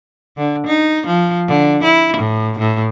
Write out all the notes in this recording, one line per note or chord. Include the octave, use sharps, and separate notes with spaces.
D3
D#4
F3
D3
E4
A2
A2